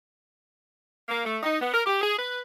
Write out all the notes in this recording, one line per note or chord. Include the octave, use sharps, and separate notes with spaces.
A#3
A3
D#4
B3
A#4
G4
G#4
B4